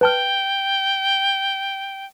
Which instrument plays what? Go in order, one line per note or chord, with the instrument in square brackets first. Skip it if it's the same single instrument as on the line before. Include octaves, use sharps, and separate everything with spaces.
[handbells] B4 A5 F6 [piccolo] G5